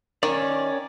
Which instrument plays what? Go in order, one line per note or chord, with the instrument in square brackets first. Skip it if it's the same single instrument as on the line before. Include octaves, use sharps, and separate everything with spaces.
[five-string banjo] D#3 [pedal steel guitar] C#4 D5